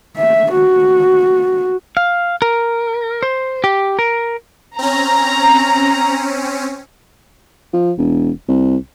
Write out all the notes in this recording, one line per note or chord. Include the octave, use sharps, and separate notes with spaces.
E5
F#4
F5
A#4
C5
G4
A#4
C4 C#4 A#5
F3
E1
C2